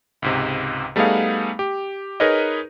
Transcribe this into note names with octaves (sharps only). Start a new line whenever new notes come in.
C#2 G#2 C3
G3 A3 B3 D#4 G#4 F5
G4
D#4 G#4 A#4 B4 C#5 D#5